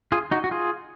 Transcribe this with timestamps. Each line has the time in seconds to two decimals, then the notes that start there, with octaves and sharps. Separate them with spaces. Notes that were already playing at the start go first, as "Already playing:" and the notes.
0.12 F4 G#4
0.31 D#4 F#4
0.44 F#4
0.51 F4 G#4